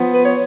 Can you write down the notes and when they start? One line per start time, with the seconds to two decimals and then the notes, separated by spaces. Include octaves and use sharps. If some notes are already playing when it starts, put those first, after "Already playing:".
Already playing: F3 B3
0.12 B4
0.24 C#5